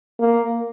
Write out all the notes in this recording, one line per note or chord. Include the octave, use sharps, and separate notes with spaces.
A#3